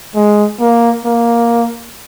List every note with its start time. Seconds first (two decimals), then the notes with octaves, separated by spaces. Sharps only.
0.15 G#3
0.60 A#3
1.05 A#3